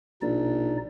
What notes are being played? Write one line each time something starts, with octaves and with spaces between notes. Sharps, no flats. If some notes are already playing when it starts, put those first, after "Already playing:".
A#1 B2 D#4 D5